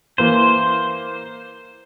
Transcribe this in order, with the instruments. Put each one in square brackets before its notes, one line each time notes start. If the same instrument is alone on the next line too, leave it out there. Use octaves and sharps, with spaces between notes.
[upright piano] E3 A#3 [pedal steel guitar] C5